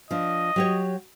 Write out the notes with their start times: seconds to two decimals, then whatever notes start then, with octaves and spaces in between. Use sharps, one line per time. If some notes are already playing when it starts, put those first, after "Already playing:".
0.11 F3 D4 D#5
0.56 F#3 G4 C#5